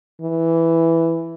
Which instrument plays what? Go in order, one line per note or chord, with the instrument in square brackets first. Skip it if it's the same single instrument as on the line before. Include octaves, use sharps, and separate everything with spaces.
[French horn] E3